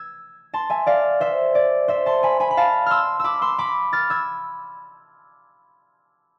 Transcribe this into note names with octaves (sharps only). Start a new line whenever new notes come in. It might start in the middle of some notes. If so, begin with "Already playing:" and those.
Already playing: E6 G#6
A5 C6
E5 G#5
D5 F5
C5 E5
D5
C5 E5
A5 C6
G#5 B5
G#5 B5
B5
F5 A5
C6 E6 F6
B5 D6 E6
C6 E6
B5 D6
F6 A6
E6 G#6